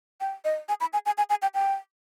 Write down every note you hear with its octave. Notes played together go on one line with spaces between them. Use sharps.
G5
D#5
G#5
B5
G#5
G#5
G#5
G#5
G5
G5